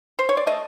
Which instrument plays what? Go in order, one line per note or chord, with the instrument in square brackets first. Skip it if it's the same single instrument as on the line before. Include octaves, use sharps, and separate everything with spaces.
[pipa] C5
C#5
D5
A3 D#5